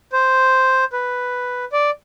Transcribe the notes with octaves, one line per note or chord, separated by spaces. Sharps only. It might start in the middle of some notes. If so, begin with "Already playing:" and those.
C5
B4
D5